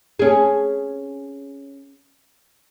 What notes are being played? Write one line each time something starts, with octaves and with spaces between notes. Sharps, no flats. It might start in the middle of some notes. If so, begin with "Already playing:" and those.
C#4 G#4